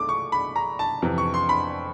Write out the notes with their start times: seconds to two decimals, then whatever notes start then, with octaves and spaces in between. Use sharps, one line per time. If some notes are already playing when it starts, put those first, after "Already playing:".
Already playing: A3 D6
0.09 C#6
0.32 B5
0.56 A#5
0.79 A5
1.02 F2 C3 E3
1.18 C#6
1.34 C6
1.49 B5